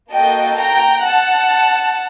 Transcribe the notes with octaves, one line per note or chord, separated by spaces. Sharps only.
A#3 F#4 A4 D#5 G5
G5 A#5
F#5 A5